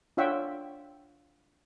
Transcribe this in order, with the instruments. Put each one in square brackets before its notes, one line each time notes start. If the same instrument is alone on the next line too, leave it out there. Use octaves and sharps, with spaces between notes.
[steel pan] D4 F4 C#5 E5 F#5 G5